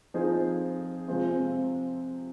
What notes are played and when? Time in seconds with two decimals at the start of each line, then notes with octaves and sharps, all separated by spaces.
0.14 F3 C4 D#4 G#4
1.08 C3 F3 G#3 C4 F4